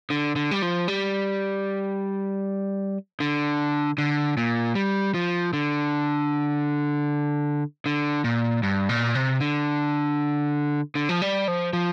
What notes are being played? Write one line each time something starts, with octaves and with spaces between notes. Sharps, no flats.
D3
D3
G3
F3
G3
D3
D3
A#2
G3
F3
D3
D3
A#2
G2
A#2
C3
D3
D3
F3
G3
F3
F3